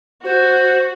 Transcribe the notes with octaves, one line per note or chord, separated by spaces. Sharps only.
F#4 C5